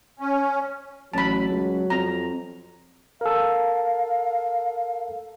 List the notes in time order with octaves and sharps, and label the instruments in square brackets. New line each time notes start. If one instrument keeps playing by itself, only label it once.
[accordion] C#4
[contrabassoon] A1 [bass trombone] F#3 [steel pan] A5 B5
[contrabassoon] C#2
[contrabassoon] F2 [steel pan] A#5
[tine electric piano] A4 A#4 [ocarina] F5